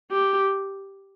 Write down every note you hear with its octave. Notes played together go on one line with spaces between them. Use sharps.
G4